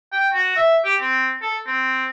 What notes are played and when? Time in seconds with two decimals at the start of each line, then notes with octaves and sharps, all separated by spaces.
0.12 G5
0.34 F#4
0.56 E5
0.85 G4
1.00 C4
1.42 A4
1.67 C4